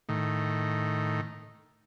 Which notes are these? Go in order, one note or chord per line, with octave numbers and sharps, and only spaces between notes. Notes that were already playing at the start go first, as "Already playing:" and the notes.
A2 D#3